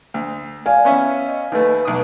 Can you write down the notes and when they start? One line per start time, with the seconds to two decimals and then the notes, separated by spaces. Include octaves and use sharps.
0.14 D2
0.66 D5 F5 G#5
0.85 B3 C#4 E5
1.26 D#5
1.52 D#2 A3 B4
1.85 B1 D#6